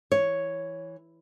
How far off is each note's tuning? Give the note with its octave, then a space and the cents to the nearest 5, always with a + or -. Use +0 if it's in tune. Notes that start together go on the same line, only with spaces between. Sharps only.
E3 +0 C#5 +0